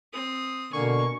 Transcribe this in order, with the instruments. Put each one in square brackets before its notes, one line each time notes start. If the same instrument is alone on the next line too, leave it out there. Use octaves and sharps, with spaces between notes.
[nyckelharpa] C4 D#6
[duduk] B2 [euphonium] D3 [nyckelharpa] A#3 G#5 [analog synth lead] C#6